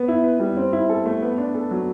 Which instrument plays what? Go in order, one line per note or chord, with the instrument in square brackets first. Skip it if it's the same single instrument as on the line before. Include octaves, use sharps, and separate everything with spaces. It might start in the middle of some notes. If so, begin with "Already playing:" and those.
Already playing: [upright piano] B3
E4
B4
G3
C4
E4
A4
A3
B3
D4
A4
F#3